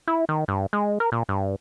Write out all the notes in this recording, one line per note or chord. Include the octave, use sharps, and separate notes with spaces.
E4
D#3
G2
G#3
A#4
A#2
G2